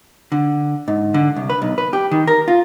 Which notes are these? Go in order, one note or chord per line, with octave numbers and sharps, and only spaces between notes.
D3
G#2
D3
C2
B4
B1
B4
G4
D#3
A#4
F4